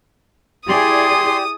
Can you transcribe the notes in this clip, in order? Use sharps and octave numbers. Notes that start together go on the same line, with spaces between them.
E4 G4 G#4 D5 C6 D#6